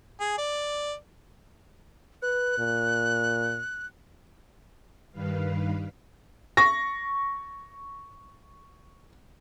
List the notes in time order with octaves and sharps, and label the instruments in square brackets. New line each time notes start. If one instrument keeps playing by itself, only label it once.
[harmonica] G#4
D5
[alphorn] B4 [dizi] F#6
[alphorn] A#2
[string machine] G2 D#3 G3 B4 F5
[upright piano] C#6 A#6